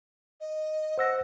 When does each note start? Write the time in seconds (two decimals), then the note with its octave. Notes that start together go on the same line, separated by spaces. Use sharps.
0.40 D#5
0.98 C5 F#5 E6 A#6